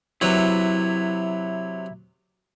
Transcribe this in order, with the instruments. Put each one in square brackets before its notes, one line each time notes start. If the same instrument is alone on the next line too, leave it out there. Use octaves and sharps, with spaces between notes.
[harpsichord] C3 F#3 B4 [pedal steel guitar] E4